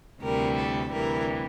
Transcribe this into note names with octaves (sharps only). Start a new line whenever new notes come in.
D2 C3 E3 G3 A#4
A4
D2 C3 E3 G3 A#4